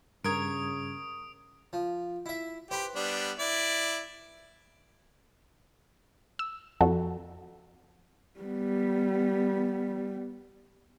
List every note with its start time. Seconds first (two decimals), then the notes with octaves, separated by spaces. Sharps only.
0.24 G2 C#3 A#4 C#5 D#6 G#6 D7
1.73 F3
2.26 E4 E5
2.71 G4 B4 C5
2.96 G3 B3 D4
3.39 E4 D5
6.39 E6
6.81 F2 F#4 A4
8.40 G3 B3